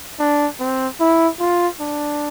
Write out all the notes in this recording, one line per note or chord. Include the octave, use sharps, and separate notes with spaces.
D4
C4
E4
F4
D4